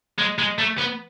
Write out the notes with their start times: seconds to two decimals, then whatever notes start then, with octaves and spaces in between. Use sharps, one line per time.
0.18 G#3
0.38 G#3
0.59 A3
0.78 B3